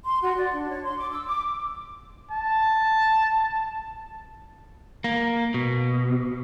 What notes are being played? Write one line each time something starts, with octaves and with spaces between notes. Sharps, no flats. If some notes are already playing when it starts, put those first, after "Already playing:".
C6
F#4
D5
D4
C#5
C6
D6
E6
D6
A5
A#3
B2